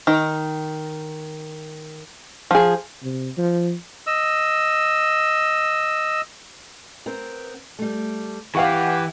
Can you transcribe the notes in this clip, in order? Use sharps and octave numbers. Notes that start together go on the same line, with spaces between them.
D#3
F3 G#4
C3
F3
D#5 E6
B3 C4 A#4
G3 A3
E3 G4 B4 F5 F#5 C#6